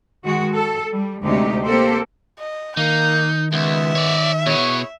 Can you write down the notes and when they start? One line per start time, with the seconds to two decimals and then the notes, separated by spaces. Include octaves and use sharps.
0.24 D#3 G#3 F#4
0.55 A4
0.93 G3
1.23 D2 C3 G#3 D#4 G4
1.65 A#3 C4 G4 A4 C5
2.39 D#5
2.77 D#3 A#3 D#4 G6
3.53 C#2 G#3 B3 E5
3.95 C#5 D5
4.46 B2 B3 E4 G#4 C#5